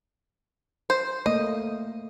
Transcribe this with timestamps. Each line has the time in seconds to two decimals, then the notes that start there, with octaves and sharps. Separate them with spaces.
0.90 C5
1.26 A3 A#3 D#5